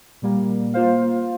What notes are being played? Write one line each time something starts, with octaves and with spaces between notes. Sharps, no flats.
A#2 G3 A#3
A#3 F4 C5 F5